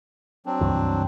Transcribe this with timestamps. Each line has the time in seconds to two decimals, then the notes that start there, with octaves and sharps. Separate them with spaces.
0.46 F#3 C4 D4
0.61 C#2 G2 E3